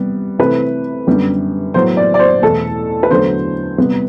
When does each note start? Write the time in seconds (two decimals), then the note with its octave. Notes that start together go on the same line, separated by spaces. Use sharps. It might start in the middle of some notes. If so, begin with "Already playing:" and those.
Already playing: C3 G3 B3
0.39 C3 E3 A3 B4
1.07 F#2 D3 G3 B3
1.74 A2 F#3 B3 C5
1.97 D5
2.14 D5
2.19 C5
2.42 E2 B2 A3 A4
3.03 B4
3.09 E2 D3 F#3 A3 C5
3.78 C3 G3 B3